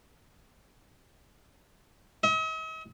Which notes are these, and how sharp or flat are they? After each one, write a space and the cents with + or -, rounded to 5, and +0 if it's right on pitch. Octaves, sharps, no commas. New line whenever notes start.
D#5 +45